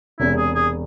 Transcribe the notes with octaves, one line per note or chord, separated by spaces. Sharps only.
E1 E2 C3 G#3 E4
G#4
G#4